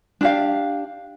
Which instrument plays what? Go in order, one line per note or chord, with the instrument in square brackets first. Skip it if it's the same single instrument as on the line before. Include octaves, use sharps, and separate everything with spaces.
[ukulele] D4 G4 F5